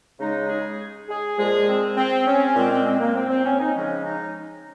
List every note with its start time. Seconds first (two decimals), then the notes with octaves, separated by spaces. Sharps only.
0.19 C#3 G#3 D#4
0.49 G#4
1.08 G#4
1.38 A#2 F3 G#3 G#4
1.67 C4
1.97 C4
2.26 C#4
2.56 A#2 G#3 C4
2.71 C4
2.86 C4
3.00 A#3
3.15 C4
3.29 C4
3.45 C#4
3.59 D#4
3.74 C#3 F3 G#3 C#4
4.04 D#4